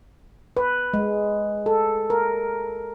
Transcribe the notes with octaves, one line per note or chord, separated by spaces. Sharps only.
B4
G#3
A4
A#4